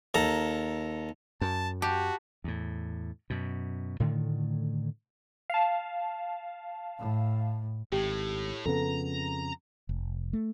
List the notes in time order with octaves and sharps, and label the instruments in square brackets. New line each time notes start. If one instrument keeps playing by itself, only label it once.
[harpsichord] D#2 A4 A#5
[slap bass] F#2 [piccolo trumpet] A5
[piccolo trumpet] F#4 [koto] G4 [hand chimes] A5
[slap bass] E2 A2
F#2 B2
A2 D3 D#3 A3
[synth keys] F5 A5
[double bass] A2
[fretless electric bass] G#1 [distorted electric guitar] A2 [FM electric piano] G4
[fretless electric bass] F2 C#3 B3 [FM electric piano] A4 [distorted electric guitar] A#5
[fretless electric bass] F1
A3